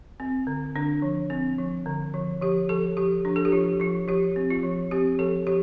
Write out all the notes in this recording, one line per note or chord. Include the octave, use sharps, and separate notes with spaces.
C4
D3
D3 D4
F3
C4
F3
D3
F3
F3 G4
F3 A4
F3 G4
F3 D4
A4
G4
F3 F4
F3 F4
F3 G4
C4
F4
F3
C4 G4
F3 A4
F3 G4